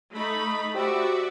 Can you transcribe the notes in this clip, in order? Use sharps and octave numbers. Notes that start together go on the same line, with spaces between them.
A3 D#4 B5
F#4 G4 C5 D5 E5 G5